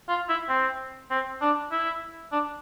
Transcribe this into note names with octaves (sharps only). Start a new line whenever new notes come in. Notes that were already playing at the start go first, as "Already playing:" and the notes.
F4
E4
C4
C4
D4
E4
D4